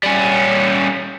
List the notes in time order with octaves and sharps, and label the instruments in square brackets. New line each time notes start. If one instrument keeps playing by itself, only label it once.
[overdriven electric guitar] G3 C#4